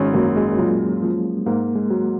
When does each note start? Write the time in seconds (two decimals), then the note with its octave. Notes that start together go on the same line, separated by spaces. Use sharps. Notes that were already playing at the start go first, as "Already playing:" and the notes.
Already playing: G#1 G#3 C#4
0.14 F#2 A#3
0.37 G#3
0.58 A#2 F#3
1.02 F3
1.46 G#2 A#3
1.76 G#3
1.90 F#3